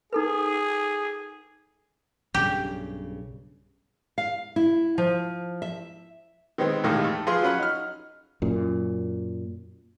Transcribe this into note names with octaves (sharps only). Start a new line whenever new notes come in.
D#4 G#4 A4 B4
B1 G2 C#3 G4
F5
E4
F3
E5
D#3 G#3 B3 C4
E2 A2 C3 D#3 G#3 A#3
A3
F3 G#4 B4 F5 C6
F#3 C#4 F4 F#5 B5
D#4 F6
F#2 A#2